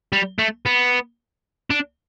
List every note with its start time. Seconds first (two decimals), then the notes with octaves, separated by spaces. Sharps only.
0.12 G3
0.39 A3
0.66 B3
1.71 D4